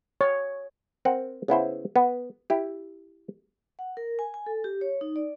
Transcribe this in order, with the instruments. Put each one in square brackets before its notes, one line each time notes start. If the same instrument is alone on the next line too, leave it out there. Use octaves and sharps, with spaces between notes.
[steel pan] C#5
[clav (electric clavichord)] C4 A#4 F#5
C#3 B3 E4 C5
B3
E4 G4
[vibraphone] F#5
A#4
G#5
G#5
A4
G4
C#5
D#4
D5